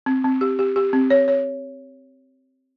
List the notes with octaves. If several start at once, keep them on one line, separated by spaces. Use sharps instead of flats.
C4
C4
G4
G4
G4
C4
C#5
C#5